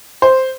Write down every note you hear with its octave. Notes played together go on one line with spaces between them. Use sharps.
C5